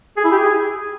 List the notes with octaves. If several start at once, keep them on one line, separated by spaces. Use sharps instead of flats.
G#4
E4
G4
G#4